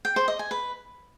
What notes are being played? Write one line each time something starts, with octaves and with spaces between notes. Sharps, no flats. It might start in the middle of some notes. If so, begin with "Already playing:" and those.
G5
C5
D#5
G#5
B4